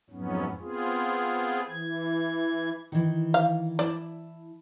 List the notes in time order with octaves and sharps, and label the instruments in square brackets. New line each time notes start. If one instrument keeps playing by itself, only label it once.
[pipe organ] F2 G#2 F#3 B3 C#4
B3 C4 F4 G#4
E3 G#6
[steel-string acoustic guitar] D#3 E3
[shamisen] F5
[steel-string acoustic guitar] E4 A5 [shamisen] D5